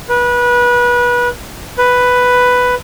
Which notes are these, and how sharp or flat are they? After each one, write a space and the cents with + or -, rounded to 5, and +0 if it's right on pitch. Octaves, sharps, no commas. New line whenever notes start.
B4 -25
B4 +5